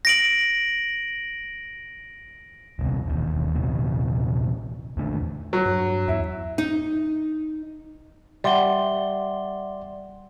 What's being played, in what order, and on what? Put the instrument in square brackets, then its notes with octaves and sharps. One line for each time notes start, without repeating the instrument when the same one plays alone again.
[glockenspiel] A#6 D7 F#7
[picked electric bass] D#1 C2 C3
E1 D#2
D#1 A#1 C3
E2 A#2 D3 A3
[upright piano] F#3
[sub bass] G2
[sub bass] E2 [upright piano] E4
[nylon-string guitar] D#4
[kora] G3 [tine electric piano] D5 C6 [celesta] E5 F#5 G7